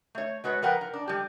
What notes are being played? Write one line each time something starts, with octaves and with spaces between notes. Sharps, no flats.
A3 C#5
G#3 F#4 B4 C#5
F3 A#4 B4 F#5 G5
A#4
D4
G3 G4